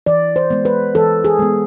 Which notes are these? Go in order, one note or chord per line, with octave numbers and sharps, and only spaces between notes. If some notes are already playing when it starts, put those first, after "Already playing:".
E3 D5
C5
G#3 B3
B4
E3 A4
G#4
G#3 B3